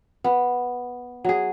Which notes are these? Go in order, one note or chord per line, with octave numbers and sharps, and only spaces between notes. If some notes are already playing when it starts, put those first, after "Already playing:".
B3
F#3 G#4